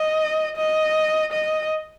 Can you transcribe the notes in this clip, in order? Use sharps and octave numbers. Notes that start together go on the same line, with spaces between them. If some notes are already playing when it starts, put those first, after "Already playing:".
Already playing: D#5
D#5
D#5